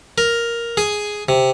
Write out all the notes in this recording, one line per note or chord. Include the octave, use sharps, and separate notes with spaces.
A#4
G#4
C3